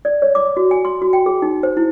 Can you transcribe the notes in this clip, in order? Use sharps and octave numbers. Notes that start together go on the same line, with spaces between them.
D5
C#5
D6
F#4
G#5
C6
F#4
G5
G#4
D#4
C5
E4